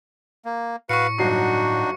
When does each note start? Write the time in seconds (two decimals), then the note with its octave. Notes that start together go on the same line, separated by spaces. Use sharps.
0.45 A#3
0.89 A2 F#4 B4 F5 C#6 C#7
1.18 G1 F#3 D4 D#4 F#4 C7